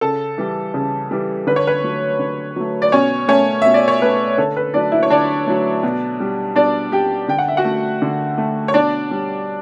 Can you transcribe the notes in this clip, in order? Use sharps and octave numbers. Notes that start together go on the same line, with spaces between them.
C#3 A4 A5
E3 G3
C#3
E3 G3
D3 B4
C#5
B4
F#3 A3
D3
F#3 A3
D5
B2 C#4 C#5
A3 C#4 C#5
B2 E5
D5
C#5
A3 B4
D3 A4
B4
F#3 A3 D4 D5
E4 E5
C#5
D3 D4 D5
F#3 A3
B2
G3
B2 D4 D5
G3 G4 G5
D3 G5
F#5
E5
F#4 F#5
A3
D3
A3
C#5
B2 D4 D5
G3